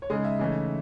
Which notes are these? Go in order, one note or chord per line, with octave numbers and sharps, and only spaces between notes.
C#5
C#3 G#3 D#4 D#5
E5
C#3 E3 A3 D#4